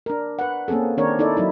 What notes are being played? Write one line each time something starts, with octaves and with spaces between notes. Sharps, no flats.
D4 A#4
B4 F#5
A#3 C4 C#4 G#4 A4
D#3 C4 D4 A#4 C#5
D#4 E4 A4 D5
F#3 D#4 E4